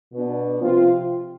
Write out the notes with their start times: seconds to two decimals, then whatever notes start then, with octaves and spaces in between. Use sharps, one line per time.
0.13 B2 B3 D4
0.61 C3 F3 C4 F4